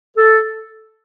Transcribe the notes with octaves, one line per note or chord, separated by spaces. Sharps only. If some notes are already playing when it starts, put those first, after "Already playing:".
A4